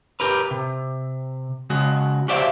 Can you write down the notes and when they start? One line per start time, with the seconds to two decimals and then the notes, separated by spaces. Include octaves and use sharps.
0.20 G4 A#4 B4
0.51 C3
1.70 C#3 G#3 F#4
2.28 F#4 G4 C5 D5 E5 F5